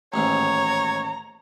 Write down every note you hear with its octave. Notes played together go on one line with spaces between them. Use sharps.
A1 D#2 G#2 C#5 A#5